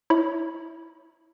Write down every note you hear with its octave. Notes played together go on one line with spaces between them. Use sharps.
E4 C#5 B5